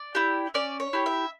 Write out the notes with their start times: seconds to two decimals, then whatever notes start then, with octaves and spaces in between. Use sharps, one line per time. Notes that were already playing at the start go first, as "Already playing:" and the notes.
Already playing: D5
0.15 E4 G4
0.54 C#4 D5
0.80 C#5
0.93 E4 G4
1.06 E5